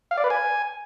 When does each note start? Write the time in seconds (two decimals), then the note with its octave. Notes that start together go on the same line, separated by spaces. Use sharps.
0.11 F5
0.17 D5
0.24 B4
0.30 G#5